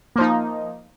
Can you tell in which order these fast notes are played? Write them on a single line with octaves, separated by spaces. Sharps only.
A#3 F3 D#4